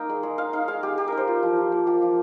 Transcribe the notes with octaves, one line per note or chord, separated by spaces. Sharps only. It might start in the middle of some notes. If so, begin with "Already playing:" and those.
Already playing: A#3 D#4 F5 G5
G#3
G#3
D#4 F5
D#4 F5
G#3 F5
G#3 G4
D#4 G4
D#4 A#4
C5
F4
F3
F3
A#3
F4 G4
F3